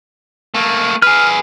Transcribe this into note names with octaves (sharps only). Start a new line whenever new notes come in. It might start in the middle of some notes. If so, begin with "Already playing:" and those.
A3 A#3
G#4 B4 F6